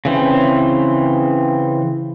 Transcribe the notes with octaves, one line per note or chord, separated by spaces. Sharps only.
C#3 E3 C4